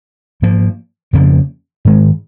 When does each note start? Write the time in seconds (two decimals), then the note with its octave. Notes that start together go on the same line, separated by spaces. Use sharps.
0.42 G#2 F3 A#3
1.13 F2 C#3 F3 A#3
1.85 G#2 D#3 G#3